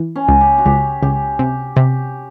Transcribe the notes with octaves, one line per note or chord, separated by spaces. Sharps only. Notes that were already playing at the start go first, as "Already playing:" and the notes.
Already playing: E3
C#4
C#2
G4
F#4
C#2 G4
C#2 G4
C3 G4
C3 G4